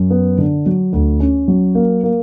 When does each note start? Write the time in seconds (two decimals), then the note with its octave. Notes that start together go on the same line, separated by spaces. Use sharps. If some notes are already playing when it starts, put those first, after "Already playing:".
Already playing: F#2
0.10 B3
0.38 D3
0.66 F#3
0.93 D2
1.20 C#4
1.48 F#3
1.75 A#3
2.03 A#3